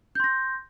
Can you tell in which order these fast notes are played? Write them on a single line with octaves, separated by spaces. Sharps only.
G6 C6 A#6